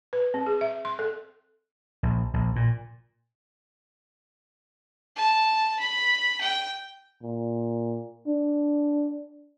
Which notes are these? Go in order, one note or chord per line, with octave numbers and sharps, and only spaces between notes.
B4
C4
G#4
E5
C6
A4
A#1
A#1
A#2
A5
B5
G5
A#2
D4